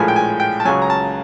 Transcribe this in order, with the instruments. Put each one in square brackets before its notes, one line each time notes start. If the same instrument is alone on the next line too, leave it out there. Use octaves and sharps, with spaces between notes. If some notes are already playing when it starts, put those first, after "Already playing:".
Already playing: [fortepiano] A#1 A2 F3 G#3 G#5
G5
G#5
G5
A5
C#2 C#3 F#3 G#5
A#5
A5